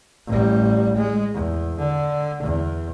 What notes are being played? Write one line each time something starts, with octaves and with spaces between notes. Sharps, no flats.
A1 G3
G#3
E2
D3
E2